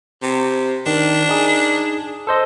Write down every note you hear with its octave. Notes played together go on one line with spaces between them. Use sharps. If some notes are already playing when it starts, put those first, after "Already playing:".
C3
D#3 D4
D#4 G#4
A4 C5 D#5